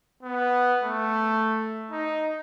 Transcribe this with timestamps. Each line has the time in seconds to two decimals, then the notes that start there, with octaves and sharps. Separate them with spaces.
0.23 B3
0.83 A3
1.91 D#4